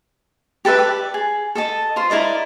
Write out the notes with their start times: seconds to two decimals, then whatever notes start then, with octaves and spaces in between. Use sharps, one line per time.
0.65 G4 A4 B4 E5
0.79 D5
1.14 G#4
1.55 A4 D#5 A5
1.96 F4 C5
2.10 E4 A#4 D5 D#5